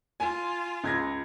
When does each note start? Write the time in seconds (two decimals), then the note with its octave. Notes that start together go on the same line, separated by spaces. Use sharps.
0.20 F4 G#5
0.84 C#2 G#6 A#6